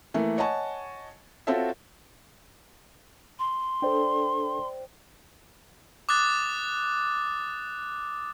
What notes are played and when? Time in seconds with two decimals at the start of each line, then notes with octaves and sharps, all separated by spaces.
0.14 E3 A3 A#3
0.38 C#5 D#5 F#5 G#5 A5 C#6
1.47 C4 F4 F#4 A4 C#5 E5
3.39 C6
3.82 D4 A4 C5 D5 G5
6.09 D6 D#6 F#6 A6